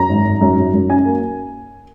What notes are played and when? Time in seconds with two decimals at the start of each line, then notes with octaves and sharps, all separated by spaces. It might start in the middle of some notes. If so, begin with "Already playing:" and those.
Already playing: F#2 A#5
0.09 G#1
0.25 G#1
0.41 F#2
0.57 F#2
0.74 F#2
0.90 C#4 G#5
1.05 A#3